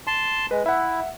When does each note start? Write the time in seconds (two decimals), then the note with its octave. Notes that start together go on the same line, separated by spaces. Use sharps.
0.07 A5 C6
0.51 G#3 B4
0.66 E4 E5 F#5